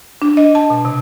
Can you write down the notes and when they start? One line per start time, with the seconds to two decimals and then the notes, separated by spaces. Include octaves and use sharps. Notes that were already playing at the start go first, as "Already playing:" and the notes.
0.22 D4
0.37 D#5
0.55 A5
0.70 B2
0.85 C3